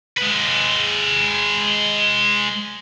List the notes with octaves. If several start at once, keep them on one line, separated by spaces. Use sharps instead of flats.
G#3 B4